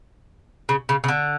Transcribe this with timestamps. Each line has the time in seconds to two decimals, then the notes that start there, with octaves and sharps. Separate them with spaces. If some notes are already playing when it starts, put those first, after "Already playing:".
0.69 C#3
0.89 C#3
1.04 C#3
1.08 D3